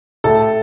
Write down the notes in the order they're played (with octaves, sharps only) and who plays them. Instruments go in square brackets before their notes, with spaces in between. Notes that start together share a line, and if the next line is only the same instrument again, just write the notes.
[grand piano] A2 A4